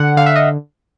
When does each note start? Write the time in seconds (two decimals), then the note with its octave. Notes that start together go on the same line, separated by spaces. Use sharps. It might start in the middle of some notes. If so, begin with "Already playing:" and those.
Already playing: D3 F#5
0.17 D3 F5
0.26 E5
0.36 D#5